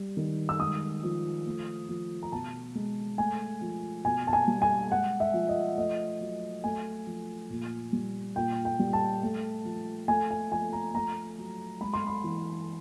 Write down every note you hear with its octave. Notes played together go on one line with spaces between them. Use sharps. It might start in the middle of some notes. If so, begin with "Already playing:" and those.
Already playing: G3
D#3
E6
G#3 D#6
F3
A3
F3
A#5
B2 A5
G#3
A3 G#5
F3
B2 G#5
A5
G#5
G3
G#5
G#3 F#5
E5
F3
D#5
A3 D#5
F#3
A3 G#5
F3
A#2
G3
A#2 G5
G5
G3
A5
A3
F3
A3 G#5
G#5
F3 G#5
A#5
A3 A#5
F#3
G#3 B5
C6
B5
E3